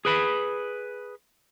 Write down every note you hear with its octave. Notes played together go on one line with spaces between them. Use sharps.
G#4 B4 B5